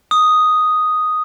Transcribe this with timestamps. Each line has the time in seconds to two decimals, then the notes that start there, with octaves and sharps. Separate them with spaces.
0.11 D#6